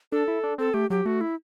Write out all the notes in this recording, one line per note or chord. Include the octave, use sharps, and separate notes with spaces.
D4 A4
E4
D4
C4 A4
A3 G4
F#3 G4
A3 F#4
E4